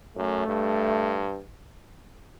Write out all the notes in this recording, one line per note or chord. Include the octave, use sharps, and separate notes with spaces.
F#2 A3
G2